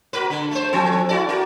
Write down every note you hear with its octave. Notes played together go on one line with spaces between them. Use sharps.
F#4 A#4 B4
D3
A3 C5
F3 C4 A4
E4 F#4 D5
F#4 A#4